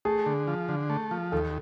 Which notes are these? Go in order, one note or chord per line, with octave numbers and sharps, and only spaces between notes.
A3 G#4
D3
F3
D3
A3
F3
D#2 A4